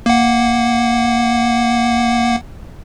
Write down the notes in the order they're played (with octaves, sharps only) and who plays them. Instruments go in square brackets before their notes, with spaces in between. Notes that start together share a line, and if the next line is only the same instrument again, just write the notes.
[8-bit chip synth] A#3 F#5